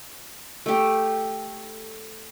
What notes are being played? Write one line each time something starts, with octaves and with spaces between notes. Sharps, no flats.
A3 G4